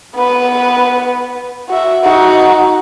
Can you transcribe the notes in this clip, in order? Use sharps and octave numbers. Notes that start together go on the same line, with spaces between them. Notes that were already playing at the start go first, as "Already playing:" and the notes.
B3 B4
F#4 E5
D#4 F#4